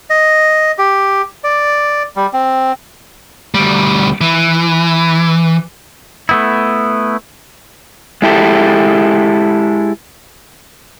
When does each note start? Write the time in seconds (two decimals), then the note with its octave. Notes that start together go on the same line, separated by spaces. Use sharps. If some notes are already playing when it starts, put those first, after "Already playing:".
0.10 D#5
0.78 G4
1.44 D5
2.16 G3
2.33 C4
3.54 D2 G3
4.21 E3
6.29 A3 B3 E4
8.22 G#3 E4 G4 A4